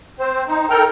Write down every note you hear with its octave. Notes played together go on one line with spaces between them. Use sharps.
C4 C5
D#4
A4 A#4 G5 F6